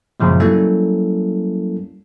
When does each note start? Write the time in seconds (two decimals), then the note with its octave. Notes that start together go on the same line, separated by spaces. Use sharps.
0.20 F#2 A#2 C#3 F3 G#3
0.40 F#3 G3 A#3 C#4 E4 A4